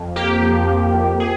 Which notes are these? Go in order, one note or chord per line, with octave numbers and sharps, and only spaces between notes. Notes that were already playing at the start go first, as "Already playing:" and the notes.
Already playing: F2
A#3 G4
F3
F3
F2
G#4